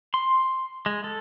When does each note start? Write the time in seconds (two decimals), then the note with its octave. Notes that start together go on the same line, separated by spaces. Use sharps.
0.14 C6
0.86 G#3
1.04 A4